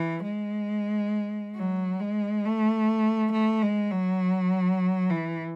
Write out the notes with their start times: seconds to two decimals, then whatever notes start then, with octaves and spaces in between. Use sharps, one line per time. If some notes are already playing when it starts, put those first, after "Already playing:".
Already playing: E3
0.23 G#3
1.56 F#3
1.99 G#3
2.45 A3
3.32 A3
3.62 G#3
3.91 F#3
5.10 E3